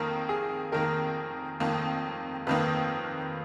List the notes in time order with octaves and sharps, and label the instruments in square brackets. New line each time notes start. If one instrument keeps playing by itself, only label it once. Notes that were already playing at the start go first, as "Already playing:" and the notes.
Already playing: [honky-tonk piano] F2 D#3 A#3 [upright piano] A#4
[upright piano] G#4
[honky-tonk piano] F2 D#3 A#3 [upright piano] A#4
[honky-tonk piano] F2 D#3 A#3
[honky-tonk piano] F2 D#3 A#3 [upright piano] B4